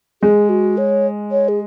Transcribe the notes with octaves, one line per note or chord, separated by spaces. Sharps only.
G#3 G#4
F#4
C#5
C#5
G#4